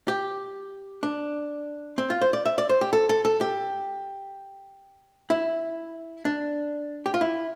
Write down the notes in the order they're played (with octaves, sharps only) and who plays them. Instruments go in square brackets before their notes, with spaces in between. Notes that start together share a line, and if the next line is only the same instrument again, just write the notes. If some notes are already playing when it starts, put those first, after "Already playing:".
[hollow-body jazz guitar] G4
D4
C4
F4
C5
D5
E5
D5
C5
G4
A4
A4
A4
G4
E4
D4
G4
F4
E4